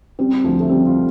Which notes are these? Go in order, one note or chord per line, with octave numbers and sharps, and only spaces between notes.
G3 C4
D2 F3
A3
G3 C4
F4